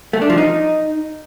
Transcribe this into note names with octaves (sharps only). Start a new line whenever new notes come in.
A3
D4
F3
D#4